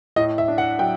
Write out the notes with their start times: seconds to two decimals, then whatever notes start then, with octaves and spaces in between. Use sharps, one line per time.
0.16 A2 D#5
0.38 E5
0.48 D4
0.58 F#5
0.79 F#3 G5